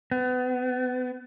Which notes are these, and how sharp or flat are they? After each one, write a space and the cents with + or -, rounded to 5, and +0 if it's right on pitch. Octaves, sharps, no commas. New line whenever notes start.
B3 +30